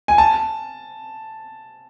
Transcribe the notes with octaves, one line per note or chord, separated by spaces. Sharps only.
G#5
A5